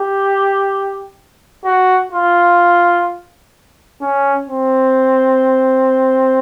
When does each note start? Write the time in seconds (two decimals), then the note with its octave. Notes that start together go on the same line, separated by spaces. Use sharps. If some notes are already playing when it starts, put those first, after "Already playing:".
Already playing: G4
1.65 F#4
2.12 F4
4.01 C#4
4.49 C4